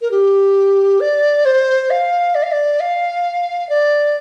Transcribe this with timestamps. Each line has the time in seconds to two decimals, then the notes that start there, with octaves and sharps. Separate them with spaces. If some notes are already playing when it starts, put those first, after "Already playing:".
0.01 A#4
0.11 G4
1.00 D5
1.45 C5
1.90 F5
2.35 D5
2.43 F5
2.52 D5
2.80 F5
3.69 D5